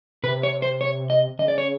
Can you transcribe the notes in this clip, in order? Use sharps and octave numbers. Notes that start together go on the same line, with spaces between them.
C3 B4
C#5
C5
C#5
D#5
C#3 D#5
D5
C#5